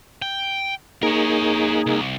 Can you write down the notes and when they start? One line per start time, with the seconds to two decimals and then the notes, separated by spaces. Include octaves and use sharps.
0.22 G5
1.03 A#3 D#4 G#4 A#4 C#5
1.86 C2